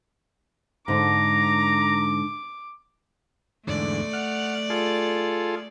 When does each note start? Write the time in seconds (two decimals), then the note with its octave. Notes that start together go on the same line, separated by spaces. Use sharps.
0.88 G#2 D3 A#5 D6
3.67 E2 G#2 D3 A3 D5
4.13 F#5 F6
4.70 F4 G#4 A4